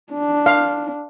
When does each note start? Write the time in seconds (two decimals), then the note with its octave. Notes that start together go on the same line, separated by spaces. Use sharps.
0.12 D4
0.46 F5